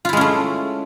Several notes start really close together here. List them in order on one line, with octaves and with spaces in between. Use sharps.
F4 E4 G#3 C#4 A3